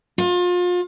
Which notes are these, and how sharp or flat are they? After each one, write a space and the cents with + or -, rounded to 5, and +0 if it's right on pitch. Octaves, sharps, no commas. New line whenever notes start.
F4 +35